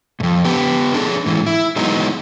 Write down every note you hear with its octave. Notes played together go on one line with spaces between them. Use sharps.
F2 G#2
B3 G4 B4
D4 G#4 A4
G#2 E3
E4
E3 F#3 G#3 B3 D#4